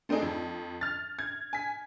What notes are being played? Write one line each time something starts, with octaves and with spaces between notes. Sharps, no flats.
A3 C4 D4 D#4 G#4
F2
F6 A6
G#6
G#5 B6